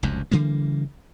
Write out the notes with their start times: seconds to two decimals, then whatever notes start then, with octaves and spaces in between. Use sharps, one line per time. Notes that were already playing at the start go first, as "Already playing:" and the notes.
0.03 F1 C#2 F#2
0.31 C#3 E3 G3 A#3